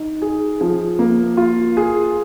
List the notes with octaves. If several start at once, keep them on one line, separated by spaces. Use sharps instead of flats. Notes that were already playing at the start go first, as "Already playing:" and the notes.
Already playing: D#4
G#4
F3
A#3
F4
G#4